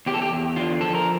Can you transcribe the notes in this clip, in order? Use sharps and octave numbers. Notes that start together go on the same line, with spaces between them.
E2 G4
A4
G4
E2
D3 F4
F3 A4
A#4